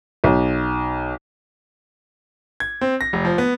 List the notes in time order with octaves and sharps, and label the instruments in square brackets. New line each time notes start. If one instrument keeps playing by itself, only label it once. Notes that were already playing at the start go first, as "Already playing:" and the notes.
[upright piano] B1
[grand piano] G#6
C4
A#6
F1
F3
B3